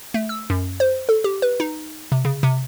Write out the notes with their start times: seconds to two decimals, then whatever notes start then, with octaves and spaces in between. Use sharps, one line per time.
0.14 A3
0.29 E6
0.50 F#2
0.80 C5
1.09 A4
1.24 G4
1.42 B4
1.60 D#4
2.12 C3
2.25 C#3
2.43 C3